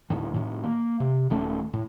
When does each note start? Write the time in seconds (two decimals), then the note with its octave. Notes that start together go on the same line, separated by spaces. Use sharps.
0.10 D2 A2 D#3
0.34 A2 D#3
0.63 A#3
1.00 C3
1.30 D#1 D#3 A3 C#4
1.73 A2